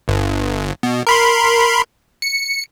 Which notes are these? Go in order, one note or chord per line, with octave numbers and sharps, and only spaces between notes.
G1
B2
A#4 B5 C6
C#7